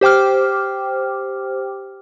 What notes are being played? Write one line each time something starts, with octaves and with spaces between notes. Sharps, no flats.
G4 C5 G5 D6 F6